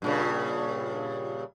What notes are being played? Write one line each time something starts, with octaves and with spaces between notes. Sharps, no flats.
G2 A#2 C#3